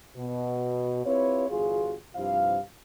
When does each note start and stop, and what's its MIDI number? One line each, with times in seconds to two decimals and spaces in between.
0.16 1.04 47
1.05 1.48 60
1.05 1.48 64
1.05 1.48 65
1.05 1.48 67
1.05 1.48 71
1.05 1.48 73
1.49 1.93 31
1.49 1.93 40
1.49 1.93 65
1.49 1.93 66
1.49 1.93 68
2.16 2.57 43
2.16 2.57 48
2.16 2.57 53
2.16 2.57 64
2.16 2.57 77